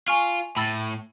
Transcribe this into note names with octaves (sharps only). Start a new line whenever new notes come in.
F4 G#5 C#6 F6
A2 B5 E6 A6